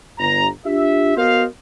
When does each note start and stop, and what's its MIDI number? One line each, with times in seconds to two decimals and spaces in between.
0.18 0.47 31
0.18 0.47 82
0.65 1.16 62
0.65 1.16 65
0.65 1.16 67
0.65 1.16 76
1.16 1.45 59
1.16 1.45 66
1.16 1.45 70
1.16 1.45 72
1.16 1.45 75
1.16 1.45 77